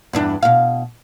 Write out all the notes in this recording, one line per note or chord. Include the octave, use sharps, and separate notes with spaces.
E2 G2 D4
B2 F5